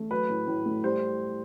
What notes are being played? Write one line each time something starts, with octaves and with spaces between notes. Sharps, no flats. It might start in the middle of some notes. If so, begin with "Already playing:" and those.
Already playing: A3
F#3 B4
A2
A2
A3
G3 C5